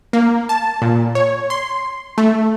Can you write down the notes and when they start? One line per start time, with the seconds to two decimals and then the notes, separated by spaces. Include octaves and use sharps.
0.13 A#3
0.49 A5
0.82 A#2
1.15 C#5
1.50 C6
2.18 A3